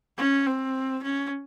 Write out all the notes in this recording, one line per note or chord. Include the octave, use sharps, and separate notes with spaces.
C#4
C4
C#4